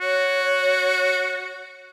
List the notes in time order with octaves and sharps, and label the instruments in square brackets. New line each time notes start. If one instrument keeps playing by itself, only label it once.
[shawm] F#4 [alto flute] C#5